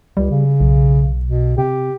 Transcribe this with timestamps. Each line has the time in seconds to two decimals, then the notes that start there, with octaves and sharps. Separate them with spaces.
0.17 C#2 G3
0.30 C#3
0.61 B1
1.26 B2
1.58 C3 G4